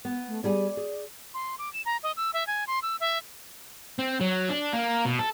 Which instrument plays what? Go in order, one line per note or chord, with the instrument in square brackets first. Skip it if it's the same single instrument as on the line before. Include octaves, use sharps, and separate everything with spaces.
[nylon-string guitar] B3
[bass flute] A3
[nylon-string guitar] G3 G#4 G#5 [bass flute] D5
[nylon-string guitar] G#4
[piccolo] C6
D6
E7
A#5
D#5
E6
E5
G#5
C6
E6
E5
[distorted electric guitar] C4
F#3
D4
A#3
B2
A4